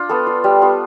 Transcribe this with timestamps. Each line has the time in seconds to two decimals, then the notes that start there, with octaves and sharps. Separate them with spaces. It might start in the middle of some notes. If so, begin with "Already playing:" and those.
Already playing: D4 F4
0.09 B3 A4
0.27 F4
0.44 G3
0.62 B3 F4